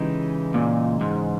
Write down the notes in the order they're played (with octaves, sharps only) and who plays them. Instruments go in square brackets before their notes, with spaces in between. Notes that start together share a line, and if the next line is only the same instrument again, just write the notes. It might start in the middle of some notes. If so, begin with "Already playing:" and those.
Already playing: [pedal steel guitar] C#3 E3 G#3 D#4 G4
[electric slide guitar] A#2
G#2